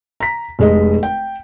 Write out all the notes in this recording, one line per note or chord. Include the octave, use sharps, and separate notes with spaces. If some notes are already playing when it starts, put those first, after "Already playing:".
A#5 B6
F1 G#3 D#5
G5